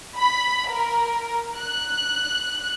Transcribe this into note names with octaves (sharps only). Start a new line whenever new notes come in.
B5
A#4
F#6